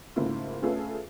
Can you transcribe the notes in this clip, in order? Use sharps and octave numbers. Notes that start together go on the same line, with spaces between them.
G#2 C#3 A3 A#3 E4 F4
A3 C#4 F4 G#4 A4 B4